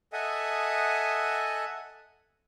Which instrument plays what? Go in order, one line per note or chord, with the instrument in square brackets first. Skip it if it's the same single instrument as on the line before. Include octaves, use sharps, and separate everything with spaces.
[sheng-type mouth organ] A4 D#5 E5 F#5 G#5 D#6